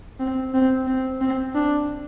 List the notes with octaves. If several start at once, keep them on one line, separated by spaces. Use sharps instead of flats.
C4
C4
C4
C4
D4